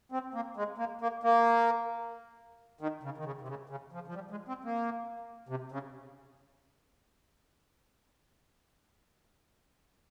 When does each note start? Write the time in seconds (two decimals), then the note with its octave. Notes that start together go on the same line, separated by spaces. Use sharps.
0.12 C4
0.34 A#3
0.57 G#3
0.78 A#3
1.01 A#3
1.23 A#3
2.81 D#3
3.03 C#3
3.18 D#3
3.25 C#3
3.41 C3
3.48 C#3
3.69 C#3
3.93 F3
4.08 F3
4.15 G3
4.31 G#3
4.48 C4
4.65 A#3
5.49 C3
5.72 C#3